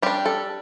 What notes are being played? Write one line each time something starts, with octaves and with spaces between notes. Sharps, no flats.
G3 D4 G4
A4